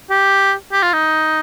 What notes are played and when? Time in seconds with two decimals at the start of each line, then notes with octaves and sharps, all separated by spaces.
0.10 G4
0.72 G4
0.83 F4
0.93 D#4